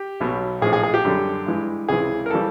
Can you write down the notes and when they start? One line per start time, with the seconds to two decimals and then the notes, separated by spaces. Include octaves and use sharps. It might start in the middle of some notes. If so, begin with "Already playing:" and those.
Already playing: G4
0.20 B1 B2 F#3
0.62 A#1 A2 F3 G#4
0.73 G#4
0.83 G#4
0.94 G4
1.05 F#2 D3 G3
1.47 G2 E3 G#3
1.89 C#2 C3 E3 G#4
2.26 A#4
2.30 C#3 E3 G3 A4